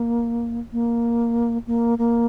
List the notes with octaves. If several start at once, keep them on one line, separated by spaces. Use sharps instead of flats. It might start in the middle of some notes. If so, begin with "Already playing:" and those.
Already playing: A#3
A#3
A#3
A#3